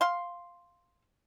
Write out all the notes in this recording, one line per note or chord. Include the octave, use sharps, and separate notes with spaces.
F5 C6